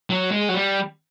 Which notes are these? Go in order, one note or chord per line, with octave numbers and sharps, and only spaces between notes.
F#3
G#3
F#3
G3